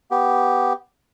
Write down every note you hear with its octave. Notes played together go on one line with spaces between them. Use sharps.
B3 G4